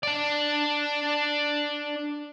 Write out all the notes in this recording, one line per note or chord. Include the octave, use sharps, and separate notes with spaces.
D4 D5